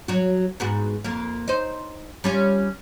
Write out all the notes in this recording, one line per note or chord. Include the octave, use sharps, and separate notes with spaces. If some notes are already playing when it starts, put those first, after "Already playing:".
F#3 F#4
G#2 B3 F#4
F2 A#3
D#4 C5
G3 C#4 F4